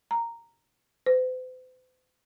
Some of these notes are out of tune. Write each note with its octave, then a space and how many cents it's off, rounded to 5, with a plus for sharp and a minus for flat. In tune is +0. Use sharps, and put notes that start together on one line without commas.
A#5 -5
C5 -45